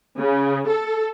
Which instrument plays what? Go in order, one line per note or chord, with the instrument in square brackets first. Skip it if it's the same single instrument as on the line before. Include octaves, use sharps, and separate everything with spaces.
[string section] C#3
A4